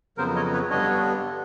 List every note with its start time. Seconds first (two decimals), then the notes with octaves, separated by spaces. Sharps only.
0.17 F2 C#3 F#3 B3 A#4 C5
0.36 C#5 D#5
0.53 B4 C#5
0.70 G2 D3 G3 B3 D4 C#5 D#5